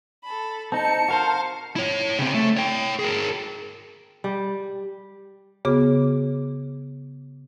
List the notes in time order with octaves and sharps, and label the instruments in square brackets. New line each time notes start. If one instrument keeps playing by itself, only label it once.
[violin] A4 B5
[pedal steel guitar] C4 D#4 [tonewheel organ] A5 [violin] C#7
[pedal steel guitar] F#4 A#4 C5 [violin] F5
[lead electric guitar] E4 C#5
C#3 C4
A3
C#5 G5
G#4 A#4
[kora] G3
[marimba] C#3 B3 F#4 G#4 D6